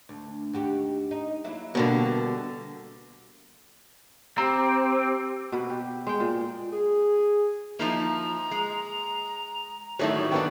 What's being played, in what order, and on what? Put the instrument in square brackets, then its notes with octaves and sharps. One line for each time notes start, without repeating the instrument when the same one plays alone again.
[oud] D2
D#2 F#4 G4
D#4
F#3 A#3 E4
[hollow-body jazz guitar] B2 D3 A#3 [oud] G3 D4
[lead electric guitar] C4 [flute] G4 [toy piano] A#5
[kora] B2 B4
G4
G#3 G5
A#2
[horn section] G#4
[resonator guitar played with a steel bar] F3 D#4 E4 [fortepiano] A#3 [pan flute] A#5
[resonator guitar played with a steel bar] G#3
[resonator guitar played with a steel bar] A2 D#3 G3 [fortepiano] F#3 A3 E4 [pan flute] F#4
[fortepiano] D#3 B3 D4